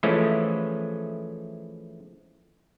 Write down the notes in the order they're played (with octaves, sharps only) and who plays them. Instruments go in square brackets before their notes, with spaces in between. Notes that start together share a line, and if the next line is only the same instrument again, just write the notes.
[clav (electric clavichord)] E3 F3 G#3 A3 C#4 E4